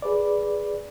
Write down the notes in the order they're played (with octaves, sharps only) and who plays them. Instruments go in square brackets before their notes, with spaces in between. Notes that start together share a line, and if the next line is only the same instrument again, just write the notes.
[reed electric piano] G#4 B4 D5